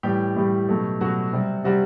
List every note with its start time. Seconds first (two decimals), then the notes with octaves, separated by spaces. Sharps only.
0.03 A2 E3 G3 G4
0.36 A2 E3 G3
0.69 B2 F#3 A3
1.01 B2 F#3 A3 F#4
1.33 C3 G3
1.64 C3 G3 F#4